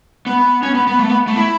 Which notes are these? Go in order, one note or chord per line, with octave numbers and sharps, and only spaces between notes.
B3
C#4
B3
B3
A3
B3
A3
E4